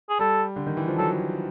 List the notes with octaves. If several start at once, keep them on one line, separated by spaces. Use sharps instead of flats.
G#4
G3 A4
D3
D#3
E3
F3
F#3 A4